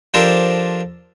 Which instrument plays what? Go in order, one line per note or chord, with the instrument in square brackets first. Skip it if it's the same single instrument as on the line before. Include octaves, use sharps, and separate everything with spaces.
[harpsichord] F3 D4 G4 A4 A#4 C5